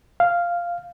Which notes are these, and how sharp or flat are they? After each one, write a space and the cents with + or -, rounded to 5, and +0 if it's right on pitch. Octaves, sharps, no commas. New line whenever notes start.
F5 -5